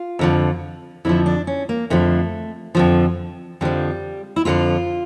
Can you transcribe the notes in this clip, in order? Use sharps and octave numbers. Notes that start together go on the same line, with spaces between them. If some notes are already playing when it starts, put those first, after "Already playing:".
Already playing: F4
F2 D3 F3
F2 D3 F3 E4
D4
C#4
A#3
F2 D3 F3 A3
F2 D3 F3
F2 D3 F3 G3
E4
F2 D3 F3 F4